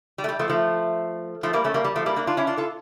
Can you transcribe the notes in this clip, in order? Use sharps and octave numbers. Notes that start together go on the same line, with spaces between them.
G3
A3
G3
F3 A3
F3 A3
F3 A3
G3 A#3
A3 C#4
G3 A#3
G3
F3 A3
G3 A#3
A#3 D4
D4 F4
C#4 E4
D4 F4
F4 A4